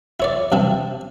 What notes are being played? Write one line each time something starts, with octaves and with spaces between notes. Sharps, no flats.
E4 C#5 D5
G2 C3 E4